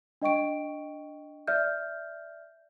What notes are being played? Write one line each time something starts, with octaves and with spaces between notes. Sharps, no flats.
D4 D#5 G5 C#6 D7
D5 E5 F6 G6